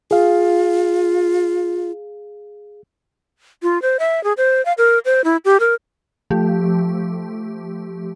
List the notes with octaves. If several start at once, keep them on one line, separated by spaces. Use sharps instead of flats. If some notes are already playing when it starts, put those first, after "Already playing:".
F4 G#4 F5
F4
C5
E5
G#4
C5
F5
A#4
C5
E4
G4
A#4
F3 A3 G4